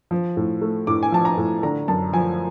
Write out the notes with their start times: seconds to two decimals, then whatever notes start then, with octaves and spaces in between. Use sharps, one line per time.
0.11 F3
0.37 A2
0.61 A3
0.87 A2 D6
1.03 G#5
1.12 F3 A5
1.25 A#5
1.37 A2
1.63 D3 A#5
1.88 F#2 A5
2.13 F3 G#5